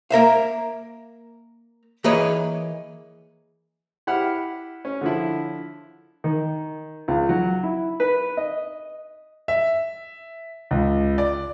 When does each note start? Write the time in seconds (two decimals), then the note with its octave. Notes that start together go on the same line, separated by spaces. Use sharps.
0.10 A#3 A#4 E5 F5
2.04 E3 A#3 G#4 B4 C#5 D#5
4.07 E4 G4 F#5 B5 F6
4.85 C#4
5.01 D3 F3 E4
6.24 D#3
7.08 C#2
7.29 F#3
7.63 E4
8.00 B4
8.37 D#5
9.48 E5
10.71 C#2
11.18 D5